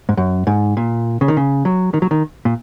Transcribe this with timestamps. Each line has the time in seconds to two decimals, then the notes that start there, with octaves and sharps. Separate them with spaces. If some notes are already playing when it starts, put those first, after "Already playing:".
0.09 G#2
0.17 F#2
0.47 G#2
0.77 A#2
1.21 C#3
1.28 D#3
1.37 C#3
1.65 F#3
1.94 D#3
2.02 F#3
2.11 D#3
2.45 A#2